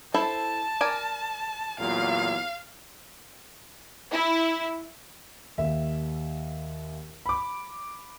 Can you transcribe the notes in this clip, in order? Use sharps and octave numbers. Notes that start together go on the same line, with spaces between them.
E4 A4 C5 A5
A#4 D5 G#5
E2 A#2 F#3 F5
E4
D#2 E5
B5 D6